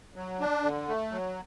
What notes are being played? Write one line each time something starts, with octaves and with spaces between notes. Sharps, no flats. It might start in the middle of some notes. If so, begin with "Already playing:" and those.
F#3
D4
D3
A3
F#3